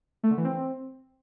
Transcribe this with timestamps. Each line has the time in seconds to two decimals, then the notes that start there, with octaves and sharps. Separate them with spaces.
0.23 A3
0.30 D3
0.37 E3
0.44 C4